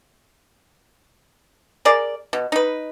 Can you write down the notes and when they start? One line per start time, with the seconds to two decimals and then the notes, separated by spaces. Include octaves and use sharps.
1.85 G#4 A#4 D5
2.33 B2
2.52 D#4 B4